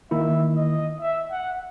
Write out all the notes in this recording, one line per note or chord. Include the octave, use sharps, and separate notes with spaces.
D#3 A#3 E4 E5
D#5
E5
F#5